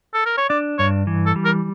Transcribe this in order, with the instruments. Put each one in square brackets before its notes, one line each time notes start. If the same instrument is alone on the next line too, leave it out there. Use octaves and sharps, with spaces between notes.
[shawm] A4
A#4
C#5
[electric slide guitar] D4 [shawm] D5
[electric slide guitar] G2 [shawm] C#5
[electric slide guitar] E3
[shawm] A4
[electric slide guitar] G3
[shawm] A#4